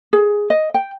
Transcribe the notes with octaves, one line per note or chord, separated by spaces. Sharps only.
G#4
D#5
G5